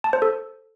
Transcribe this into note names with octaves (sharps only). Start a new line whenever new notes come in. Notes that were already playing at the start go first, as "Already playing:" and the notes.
A5
C5
A4